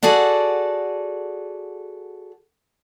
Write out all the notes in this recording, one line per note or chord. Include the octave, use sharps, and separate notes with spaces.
F#4 G#4 A4 D5 F#5